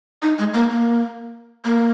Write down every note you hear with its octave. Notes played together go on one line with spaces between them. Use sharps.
D#4
G#3
A#3
A#3
A#3